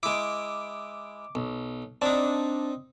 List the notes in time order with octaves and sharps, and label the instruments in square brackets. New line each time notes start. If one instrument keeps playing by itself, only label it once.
[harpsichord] G#3 E4 [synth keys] D6
[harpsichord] B1
[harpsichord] C4 D#4 [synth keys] D4